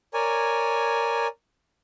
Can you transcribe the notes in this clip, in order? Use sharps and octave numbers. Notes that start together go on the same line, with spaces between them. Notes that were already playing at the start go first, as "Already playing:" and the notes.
A#4 C#5 D5 G#5